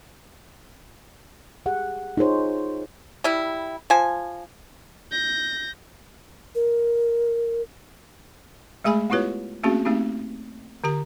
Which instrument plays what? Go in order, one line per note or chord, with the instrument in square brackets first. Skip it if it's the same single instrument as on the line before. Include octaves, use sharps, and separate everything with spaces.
[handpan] G4 G#4 F#5
D#4 F4 G#4 C5 C#5
[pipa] G3 E4
F3 G#5
[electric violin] G6 A#6
[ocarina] A#4
[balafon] G#3 A3 G#4 G#5 B5
B3 E4 F4 G4 B4 C#5
A3 A#3 C4 C#4 F#4 G#4
A3 A#3 C4 D#4 G4
D3 G4 A#5